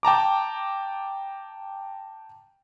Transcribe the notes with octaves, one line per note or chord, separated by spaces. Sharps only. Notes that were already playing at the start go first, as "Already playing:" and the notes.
G5 A5 A#5 D6